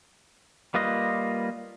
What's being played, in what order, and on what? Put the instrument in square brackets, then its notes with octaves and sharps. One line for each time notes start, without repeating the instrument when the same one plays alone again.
[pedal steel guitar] G3 A#3 F4 B4 D#5